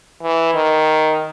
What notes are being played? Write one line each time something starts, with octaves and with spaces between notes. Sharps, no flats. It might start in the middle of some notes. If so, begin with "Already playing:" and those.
E3
D#3